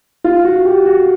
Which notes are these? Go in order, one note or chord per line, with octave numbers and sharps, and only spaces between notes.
F4
F#4
G4
F#4